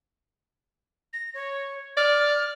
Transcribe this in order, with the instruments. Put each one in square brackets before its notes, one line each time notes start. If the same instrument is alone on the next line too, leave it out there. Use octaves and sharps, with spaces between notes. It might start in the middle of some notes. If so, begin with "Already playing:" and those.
[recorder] A#6
C#5
[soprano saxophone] D5 [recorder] F6